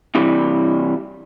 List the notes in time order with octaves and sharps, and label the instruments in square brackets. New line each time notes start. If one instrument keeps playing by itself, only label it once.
[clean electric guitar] C3 E3 G3